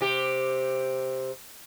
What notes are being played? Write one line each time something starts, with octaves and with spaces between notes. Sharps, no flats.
C3 G4